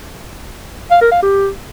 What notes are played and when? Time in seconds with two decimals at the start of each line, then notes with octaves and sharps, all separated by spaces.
0.91 F5
1.02 A#4
1.12 F5
1.22 G4